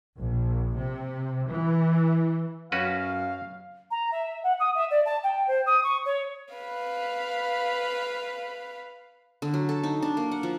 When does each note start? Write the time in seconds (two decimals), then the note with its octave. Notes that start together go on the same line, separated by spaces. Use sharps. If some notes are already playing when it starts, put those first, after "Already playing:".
0.18 A#1
0.76 C3
1.50 E3
2.72 F#2 C#4 F#4 B4 F5
3.91 A#5
4.11 E5
4.43 F#5
4.59 D#6
4.75 E5
4.90 D5
5.05 A5
5.23 G5
5.47 C5
5.66 D#6
5.83 C#6
6.05 C#5
6.55 B4 F5
9.42 D3
9.54 F#3
9.69 A4
9.83 D#4
10.02 D4
10.17 A#3
10.32 F#5
10.43 F3